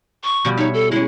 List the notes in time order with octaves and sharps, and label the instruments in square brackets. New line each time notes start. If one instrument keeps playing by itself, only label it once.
[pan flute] C#6
[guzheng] B2 F3 G3
[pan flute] D#4 [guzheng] C#5 E5
[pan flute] A4
[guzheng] G#3 C#4 [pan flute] E4